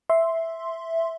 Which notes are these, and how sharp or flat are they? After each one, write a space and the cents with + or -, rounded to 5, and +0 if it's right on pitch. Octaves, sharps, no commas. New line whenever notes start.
E5 +0 C6 +0